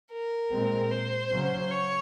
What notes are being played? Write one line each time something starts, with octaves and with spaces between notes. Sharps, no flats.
A#4
A#2 G#3 C4
C5
C#3 F#3 C#4
C#5